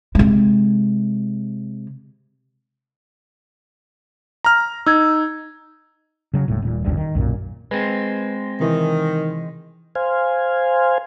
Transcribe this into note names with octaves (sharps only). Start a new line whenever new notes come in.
C3 G#3
A#5 F6
D#4 E6 G#6
C#3 F#3
D#1 A2
D#1 A#2
E1 A1 D2 G2
D#3
B1 F#2 A#2
G#3 C4 B4
C3 D#3 E3
C5 F5 G#5